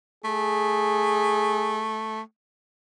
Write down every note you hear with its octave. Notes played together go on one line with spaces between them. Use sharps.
A3 G#4